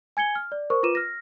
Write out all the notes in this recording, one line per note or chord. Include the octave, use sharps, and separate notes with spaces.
G#5 G#6 C#7 G7
F6
D5
A#4 C5 C#6
F4 B4 D6 D#7 E7
F6 A#6